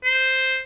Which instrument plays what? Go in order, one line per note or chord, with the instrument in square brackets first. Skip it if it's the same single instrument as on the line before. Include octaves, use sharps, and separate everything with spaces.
[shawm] C5